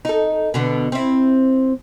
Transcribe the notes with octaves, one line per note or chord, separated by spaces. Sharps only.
D#4 A4
B2 D3 B3
C4 E4